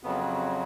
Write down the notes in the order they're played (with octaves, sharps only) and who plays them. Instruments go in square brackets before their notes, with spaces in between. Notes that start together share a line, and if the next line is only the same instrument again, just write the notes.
[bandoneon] F2 C#3 F#3 B3